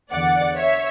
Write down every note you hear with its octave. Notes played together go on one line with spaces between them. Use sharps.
E2 D3 D5 F#5
C#5 E5